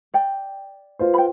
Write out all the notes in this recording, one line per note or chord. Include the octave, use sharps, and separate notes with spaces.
D5 G5
F4 B4 C5
G5 B5